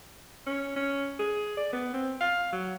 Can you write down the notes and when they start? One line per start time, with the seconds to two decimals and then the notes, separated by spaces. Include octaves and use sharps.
0.46 C#4
0.76 C#4
1.19 G#4
1.57 D5
1.73 B3
1.93 C4
2.20 F5
2.52 F#3